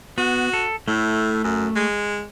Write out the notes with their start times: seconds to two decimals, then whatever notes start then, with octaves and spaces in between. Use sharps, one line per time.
0.18 B3 F#4
0.53 A4
0.88 A2 A3
1.44 F#2
1.76 G#3